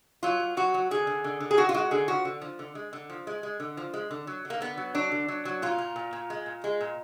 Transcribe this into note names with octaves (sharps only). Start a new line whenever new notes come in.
F#3 F4
F#3
F#3 F#4
F#3
D3 G#4
D3
D3
D3
G#4
D3 F#4
F4
G#3 F#4
D3 G#4
F3 F#4
D3
F3
D3
G#3
D3
F3
G#3
G#3
D3
F3
G#3
D3
F#3
D3
A#3
D3 B3
F#3
F#3 D4
D3
F#3
F#3
A#2 F4
A#2
A#2
A#2
G#3
A#2
G#3
A#2